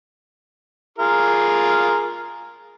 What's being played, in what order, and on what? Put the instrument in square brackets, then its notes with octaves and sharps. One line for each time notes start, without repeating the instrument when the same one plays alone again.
[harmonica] F4 G#4 A#4